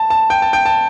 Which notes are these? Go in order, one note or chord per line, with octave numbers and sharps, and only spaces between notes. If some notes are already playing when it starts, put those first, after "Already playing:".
Already playing: A5
A5
G5
A5
G5
A5